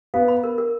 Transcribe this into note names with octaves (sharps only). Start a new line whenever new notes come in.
B3 F5
B5
A#4
A#4